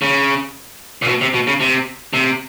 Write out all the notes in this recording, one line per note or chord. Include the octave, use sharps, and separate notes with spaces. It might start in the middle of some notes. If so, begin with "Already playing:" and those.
C#3
A#2
B2
C3
B2
C#3
C3
C3